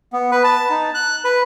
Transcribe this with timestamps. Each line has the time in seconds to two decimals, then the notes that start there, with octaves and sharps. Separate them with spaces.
0.13 B3
0.32 B4
0.44 A5
0.70 D#4
0.94 F#6
1.24 B4